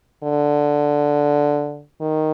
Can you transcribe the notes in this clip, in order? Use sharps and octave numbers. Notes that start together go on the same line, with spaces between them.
D3
D#3